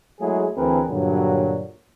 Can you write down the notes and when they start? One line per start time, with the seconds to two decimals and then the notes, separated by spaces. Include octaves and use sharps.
0.20 F#3 G#3 A3 E4 G#4
0.57 D2 E3 C4 G#4 A#4 B4
0.88 G2 A#2 D3 F#3